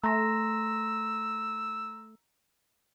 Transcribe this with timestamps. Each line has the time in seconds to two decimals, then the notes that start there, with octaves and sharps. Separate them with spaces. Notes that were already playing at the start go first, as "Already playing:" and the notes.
0.04 A3 A#5 C6 E6 A#6